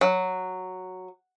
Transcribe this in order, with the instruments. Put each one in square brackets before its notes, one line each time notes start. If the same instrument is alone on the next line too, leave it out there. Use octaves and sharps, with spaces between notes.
[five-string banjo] F#3